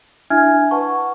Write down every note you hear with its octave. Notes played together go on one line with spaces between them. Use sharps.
D4 E4 E5 G#5 F6 G#6
B4 F#5 A5 C#6